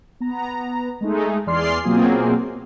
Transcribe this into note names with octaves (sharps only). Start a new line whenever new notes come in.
B3 A#5
G#3 A3 D#4
E2 G#4 D5 C6 F6 C7
B2 F#3 A#3 C4 F4 G#4